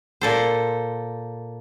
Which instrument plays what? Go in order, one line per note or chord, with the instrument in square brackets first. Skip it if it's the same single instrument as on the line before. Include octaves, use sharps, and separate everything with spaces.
[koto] A#2 A4 C5